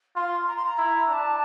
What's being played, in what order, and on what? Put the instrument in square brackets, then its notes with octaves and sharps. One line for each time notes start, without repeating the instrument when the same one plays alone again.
[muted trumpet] F4 [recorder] C6
[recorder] A#5
C6
A#5
[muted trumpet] E4
[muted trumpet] D4 [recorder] A#5
[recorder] A5